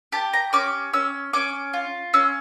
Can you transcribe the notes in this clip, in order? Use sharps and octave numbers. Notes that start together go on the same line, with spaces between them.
G4 A5
A#5
C#4 D6
C#4 E6
C#4 D6
F4
C#4 E6